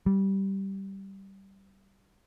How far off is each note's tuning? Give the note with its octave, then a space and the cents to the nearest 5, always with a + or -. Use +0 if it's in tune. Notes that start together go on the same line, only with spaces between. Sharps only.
G3 -10